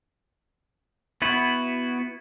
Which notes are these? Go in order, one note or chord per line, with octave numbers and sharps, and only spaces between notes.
B3 E4 F#4 B4